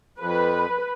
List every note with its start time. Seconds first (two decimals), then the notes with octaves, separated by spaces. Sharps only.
0.19 F2 B4